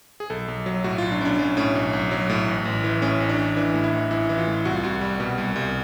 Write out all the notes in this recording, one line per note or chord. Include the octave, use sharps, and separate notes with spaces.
G#4
B1 A4
B1
F#3
A2 F#4
B1 F4
D4
B1 C#4 D4
F#3 C#4
A2 C#4
B1
B1
F#3
A2
A1
A1
E3
A2 C#4
A1
D4
A1
E3 D4
A2
E4
A1
A1 E4
E3
F4
A2
C2 F#4
F4
C2 F#4
G3
B2
C2
C2